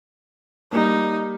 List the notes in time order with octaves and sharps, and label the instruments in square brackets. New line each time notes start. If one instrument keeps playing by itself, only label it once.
[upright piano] G3 A#3 [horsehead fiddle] D#4